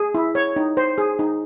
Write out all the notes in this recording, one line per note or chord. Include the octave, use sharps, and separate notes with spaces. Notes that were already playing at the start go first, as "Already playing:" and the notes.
Already playing: G#4
E4
C#5
D#4
C5
G#4
D#4